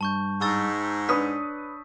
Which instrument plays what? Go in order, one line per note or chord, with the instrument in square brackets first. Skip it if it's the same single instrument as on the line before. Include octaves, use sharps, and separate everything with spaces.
[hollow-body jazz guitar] G2 [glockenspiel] A5 C#6 G6
[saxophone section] G#2 [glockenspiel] C#6 E6 A6
[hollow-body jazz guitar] D4 C#5 [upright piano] B4 D#6 [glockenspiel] B6